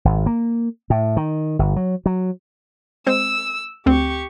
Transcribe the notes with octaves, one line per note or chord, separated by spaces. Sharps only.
G#1
A#3
A2
D#3
G1
F#3
F#3
G#3 C4 C5 E6
D2 C4 G4 C#6